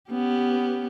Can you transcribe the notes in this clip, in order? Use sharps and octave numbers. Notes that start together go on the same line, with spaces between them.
B3 C#4 G4